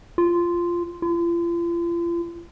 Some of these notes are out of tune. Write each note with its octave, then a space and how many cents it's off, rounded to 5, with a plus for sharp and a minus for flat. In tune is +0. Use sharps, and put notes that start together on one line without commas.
F4 -10
F4 -40